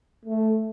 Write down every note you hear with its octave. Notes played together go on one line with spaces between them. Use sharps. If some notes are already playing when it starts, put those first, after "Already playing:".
A3